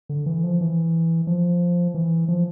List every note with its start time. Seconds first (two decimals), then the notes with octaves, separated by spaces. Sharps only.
0.09 D3
0.26 E3
0.43 F3
0.61 E3
1.27 F3
1.94 E3
2.28 F3